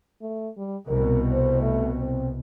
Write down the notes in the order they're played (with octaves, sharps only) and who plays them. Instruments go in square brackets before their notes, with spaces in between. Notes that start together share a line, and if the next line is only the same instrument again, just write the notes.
[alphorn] A3
G3
[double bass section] C2 B2 [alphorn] A#4
[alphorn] C5
A3
C4